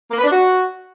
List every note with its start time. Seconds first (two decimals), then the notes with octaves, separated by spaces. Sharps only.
0.11 A#3
0.17 B4
0.24 D4
0.30 F#4